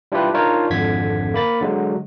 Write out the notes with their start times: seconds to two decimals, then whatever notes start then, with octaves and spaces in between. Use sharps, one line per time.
0.12 G3 D4 E4 F4 G4 B4
0.34 D4 D#4 F4 A#4 C#5
0.70 G#1 F2 D3 G#6 B6
1.34 A#3 B5 A6
1.61 D3 F#3 G#3